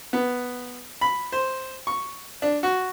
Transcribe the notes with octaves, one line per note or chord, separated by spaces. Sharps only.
B3
B5
C5
C#6
D4
F#4